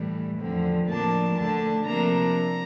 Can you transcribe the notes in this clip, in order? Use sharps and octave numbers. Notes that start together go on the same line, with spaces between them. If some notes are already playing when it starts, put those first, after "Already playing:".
Already playing: A2 E3 G3
E2 D3 F3 C4
A2 F3 A#3 D4 A5
D2 D3 A3 D4 A5
C3 F3 A#3 D4 A#5